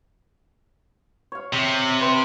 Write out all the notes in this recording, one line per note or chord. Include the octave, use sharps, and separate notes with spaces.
C#5 F5
C3
B4 C6